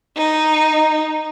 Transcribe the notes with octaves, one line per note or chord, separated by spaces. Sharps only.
D#4